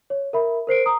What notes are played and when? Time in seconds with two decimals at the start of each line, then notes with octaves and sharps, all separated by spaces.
0.10 C#5
0.33 A#4 E5 B5
0.67 A#4 C5 C7 D7
0.86 A#5 D#6